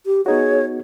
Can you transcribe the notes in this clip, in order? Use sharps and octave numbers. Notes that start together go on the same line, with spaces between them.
G4
B3 D#4 F#4 G#4 C#5